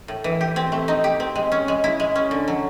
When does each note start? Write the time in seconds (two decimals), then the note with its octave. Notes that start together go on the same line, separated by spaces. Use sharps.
0.08 A2
0.24 E3
0.41 G4
0.56 C4
0.72 A3
0.88 D#4
1.04 G4
1.20 C4
1.36 G#3
1.52 C#4
1.68 G#3
1.84 E4
2.00 G#3
2.15 C#4
2.31 D3
2.48 F#3